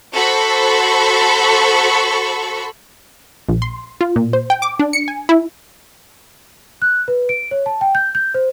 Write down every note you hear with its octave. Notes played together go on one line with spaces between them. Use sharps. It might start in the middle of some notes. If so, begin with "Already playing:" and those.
F#4 A4 C5 B5 C#6
A#1
C6
F4
A#2
C5
G5
D6
D4
C#7
G#5
E4
F#6
B4
D7
C#5
A5
G5
G6
G6
C5